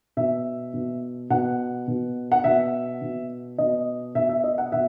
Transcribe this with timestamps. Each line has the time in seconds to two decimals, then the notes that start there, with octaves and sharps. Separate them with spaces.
0.17 B2 E5
0.74 B2
1.30 B2 F#5
1.88 B2
2.32 F#5
2.44 B2 E5
3.02 B2
3.58 B2 D#5
4.15 B2 E5
4.29 E5
4.44 D#5
4.58 F#5
4.72 B2 E5